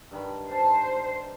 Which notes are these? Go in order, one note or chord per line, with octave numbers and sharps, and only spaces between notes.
G2 D#3 B5
C5 A5